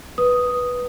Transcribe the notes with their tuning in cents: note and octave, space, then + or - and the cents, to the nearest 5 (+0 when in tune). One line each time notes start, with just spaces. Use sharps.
B4 -5 D#6 +0